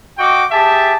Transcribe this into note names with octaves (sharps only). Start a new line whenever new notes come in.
F#4 D#5 G5 C#6 D6
G4 G#4 E5 A5